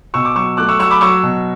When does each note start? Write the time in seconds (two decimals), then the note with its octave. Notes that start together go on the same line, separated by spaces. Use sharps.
0.14 B2 C#6 E6
0.25 D6
0.36 F#3 C#6 E6
0.57 A3 D6 F#6
0.69 C#6 E6
0.79 F#3 C#6 E6
0.91 B5 D6
1.01 F#3 C#6 E6
1.23 B2